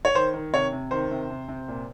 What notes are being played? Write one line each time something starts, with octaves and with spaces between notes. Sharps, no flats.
C#5
D#3 C5
D#3
C3 C#5
C3
D#3 C5
C3
C3
C3
A#2